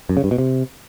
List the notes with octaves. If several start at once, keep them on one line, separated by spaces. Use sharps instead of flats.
F#2
C#3
G2
B2
C3